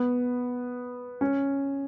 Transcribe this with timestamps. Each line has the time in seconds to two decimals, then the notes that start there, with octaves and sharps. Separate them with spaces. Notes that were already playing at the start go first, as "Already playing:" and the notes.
Already playing: B3
1.21 C#4